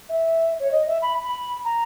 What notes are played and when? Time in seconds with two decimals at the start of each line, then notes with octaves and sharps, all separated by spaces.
0.09 E5
0.60 C#5
0.72 D#5
0.87 E5
1.02 B5
1.24 B5
1.65 A#5